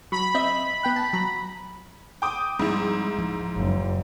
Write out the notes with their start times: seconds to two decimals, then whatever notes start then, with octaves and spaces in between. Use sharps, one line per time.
0.12 F#3 B5
0.35 C4 D#5 E5
0.83 B3 G5 F#6
0.96 A5
1.13 F#3 A#5
2.22 G5 D6 D#6
2.59 G#2 F3 G3 C4 E4
3.17 D1 F3
3.56 F#1